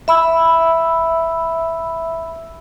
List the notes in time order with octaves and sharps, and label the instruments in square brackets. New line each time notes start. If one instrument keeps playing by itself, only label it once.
[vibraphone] E5 B5 E6